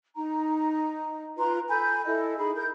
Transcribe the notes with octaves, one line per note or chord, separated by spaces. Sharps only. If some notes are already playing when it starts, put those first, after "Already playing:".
D#4 A#5
F4 B4 A#5 C6
A4 G#5 B5 G6
E4 A4 D#5
D#4 G#4 B5
A#4 G6